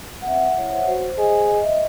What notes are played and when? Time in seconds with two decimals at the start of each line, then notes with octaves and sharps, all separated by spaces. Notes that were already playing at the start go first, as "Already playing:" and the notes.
0.22 F#5
0.27 C4 E5
0.58 E4 C#5
0.72 C5
0.88 F#4 C5
1.18 G#4 D#5
1.48 D#5
1.63 E5